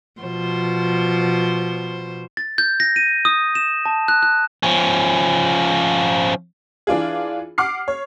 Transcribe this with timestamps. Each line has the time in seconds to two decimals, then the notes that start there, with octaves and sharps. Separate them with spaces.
0.21 B2 F3 C5
2.37 A6
2.58 G6
2.80 A#6
2.96 D#7
3.25 D#6
3.55 E7
3.86 A5
4.08 F#6
4.23 F#6
4.63 F3 C#4
6.87 E3 D4 F4 G#4
7.58 F#5 D6 F6 C7
7.88 C#5